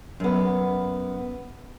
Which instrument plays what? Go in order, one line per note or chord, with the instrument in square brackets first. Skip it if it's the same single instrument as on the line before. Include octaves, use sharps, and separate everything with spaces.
[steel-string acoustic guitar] F#2 B3